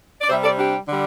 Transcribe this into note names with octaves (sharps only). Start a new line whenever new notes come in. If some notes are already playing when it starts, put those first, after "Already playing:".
D5
C3 G3 C5 E5
A4 D5
D4 G4
D3 G3